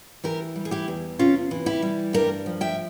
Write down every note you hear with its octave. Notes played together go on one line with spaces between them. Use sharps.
E3 G4 A#4
G3
G#4
E4 G4
E2
C3 C#4 F4
E3
E4 G4
G3
G2 G4 A#4
F3
E5 G5